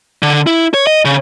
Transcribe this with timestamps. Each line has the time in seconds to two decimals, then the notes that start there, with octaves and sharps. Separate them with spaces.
0.23 D3
0.47 E4
0.74 C#5
0.87 D#5
1.05 C#3